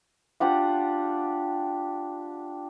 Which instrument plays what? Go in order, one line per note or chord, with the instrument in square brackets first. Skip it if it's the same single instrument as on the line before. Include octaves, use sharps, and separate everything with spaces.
[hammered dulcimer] D4 F4 G4 F#5